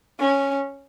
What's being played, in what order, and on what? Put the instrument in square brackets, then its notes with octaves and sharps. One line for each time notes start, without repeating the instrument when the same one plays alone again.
[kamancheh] C#4